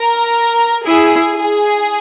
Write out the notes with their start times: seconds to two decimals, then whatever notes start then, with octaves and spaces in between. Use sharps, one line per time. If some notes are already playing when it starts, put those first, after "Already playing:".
Already playing: A#4
0.86 E4 G#4
1.38 G#4